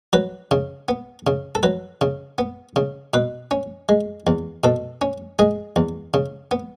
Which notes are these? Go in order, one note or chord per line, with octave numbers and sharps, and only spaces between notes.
F#3 B4
C#3
B3
C#3
A4
F#3 B4
C#3
B3
C#3
B2 B4
C#4
G#3
E2
B2 A4
C#4
G#3 G#4
E2
C#3
B3